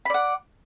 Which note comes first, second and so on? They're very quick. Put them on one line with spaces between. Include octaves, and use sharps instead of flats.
B5 D5 F#5